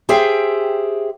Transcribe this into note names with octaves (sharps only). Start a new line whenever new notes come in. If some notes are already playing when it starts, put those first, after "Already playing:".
G4 G#4 C5 E5 G5